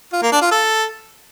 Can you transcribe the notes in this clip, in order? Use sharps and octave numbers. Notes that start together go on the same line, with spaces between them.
F4
A#3
D4
F4
A4